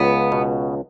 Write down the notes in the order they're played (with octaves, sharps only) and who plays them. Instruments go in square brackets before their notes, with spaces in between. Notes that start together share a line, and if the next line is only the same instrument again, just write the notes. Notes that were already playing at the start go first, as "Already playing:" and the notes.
Already playing: [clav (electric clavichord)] C#2 [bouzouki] B3
[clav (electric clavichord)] B2